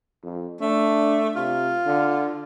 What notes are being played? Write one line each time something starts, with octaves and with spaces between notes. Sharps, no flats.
F2
A3 D4
C3 F4
D3